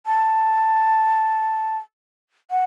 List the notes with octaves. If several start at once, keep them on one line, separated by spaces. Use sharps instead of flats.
A5
F#5